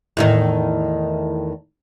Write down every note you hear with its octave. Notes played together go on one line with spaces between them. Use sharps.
E2 A2 D#3